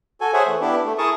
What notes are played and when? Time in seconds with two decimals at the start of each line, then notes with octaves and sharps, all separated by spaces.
0.21 F#4 A4 G#5
0.33 G#4 C5 C#5 E5 F#5 G#5
0.47 E3 A3
0.61 B3 D4 E4 G4
0.85 A3
0.98 E4 G#4 A#4 A5 C#6 D#6